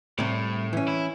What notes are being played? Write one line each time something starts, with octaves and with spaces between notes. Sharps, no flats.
C2 A2 C3
E3 C#4
E4